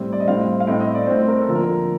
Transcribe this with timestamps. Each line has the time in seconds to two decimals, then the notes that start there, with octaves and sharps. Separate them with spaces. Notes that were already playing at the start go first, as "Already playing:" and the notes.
Already playing: A2 G3 C4
0.13 D5
0.20 D#5
0.28 A2 G3 C4 F5
0.60 F5
0.67 A2 A3 C4 D#5
0.80 D#5
0.95 D5
1.07 A2 A3 C4 C5
1.28 A#4
1.42 A4
1.48 D3 F3 A#3
1.55 A#4